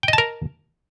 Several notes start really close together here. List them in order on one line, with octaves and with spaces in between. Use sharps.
G5 D#5 A5 A#4